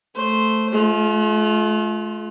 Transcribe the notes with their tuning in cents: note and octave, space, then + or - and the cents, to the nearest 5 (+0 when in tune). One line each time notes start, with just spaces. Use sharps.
A3 +0 C5 -5
A3 -45 F4 +0